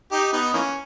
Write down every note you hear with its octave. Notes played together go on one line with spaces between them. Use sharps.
D#4 G4
B3 D#4
E3 A#3 C#4